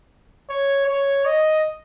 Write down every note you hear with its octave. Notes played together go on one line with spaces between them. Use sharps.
C#5
C#5
D#5